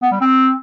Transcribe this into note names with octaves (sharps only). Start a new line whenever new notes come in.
B3
G3
C4